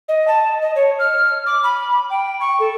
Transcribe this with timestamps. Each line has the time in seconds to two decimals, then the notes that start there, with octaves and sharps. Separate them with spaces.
0.08 D#5
0.28 A5
0.61 D#5
0.75 C#5
0.99 F6
1.46 D6
1.64 B5
2.10 G5
2.41 C#6
2.60 A4